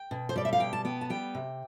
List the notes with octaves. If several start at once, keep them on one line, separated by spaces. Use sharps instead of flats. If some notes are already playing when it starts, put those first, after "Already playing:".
Already playing: G5
B2
C5
G3 D5
E5
F5
B2 G5
A5
B3 G5
A5
G3 G5
C3